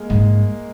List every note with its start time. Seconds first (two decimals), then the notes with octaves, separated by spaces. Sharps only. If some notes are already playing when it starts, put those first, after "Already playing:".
Already playing: G#3 A#3
0.10 G#2